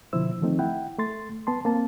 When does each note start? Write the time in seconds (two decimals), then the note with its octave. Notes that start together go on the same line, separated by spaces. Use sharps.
0.13 B2 D3 F3 E4 C5 E6
0.41 D#3 F3 A3 C4 D#4
0.59 E4 F#5 G5
0.99 A3 C6 A6
1.47 B3 A5 C6
1.65 A#3 C4 A5